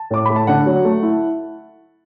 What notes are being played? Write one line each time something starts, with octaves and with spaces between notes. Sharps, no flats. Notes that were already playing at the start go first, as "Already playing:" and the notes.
Already playing: A5
A2 D6
A3 B5
A5
D3 F#5
F#3
A3
E4